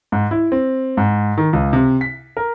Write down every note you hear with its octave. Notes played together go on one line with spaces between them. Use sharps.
G#2
E4
C4
G#2
D#3
C#2
C3
B6
A#4